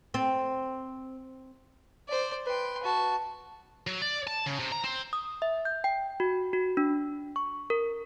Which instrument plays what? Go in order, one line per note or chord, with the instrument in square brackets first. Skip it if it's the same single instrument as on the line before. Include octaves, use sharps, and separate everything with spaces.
[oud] C4
[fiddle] C5 D5
[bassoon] B4 [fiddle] G5 C6
[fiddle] F#4 A5
[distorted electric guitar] F#3
D5
A5
C#3
C3
A#5
C4
[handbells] D#6
E5
G6
G5
F#4
F#4
D4
C#6
A#4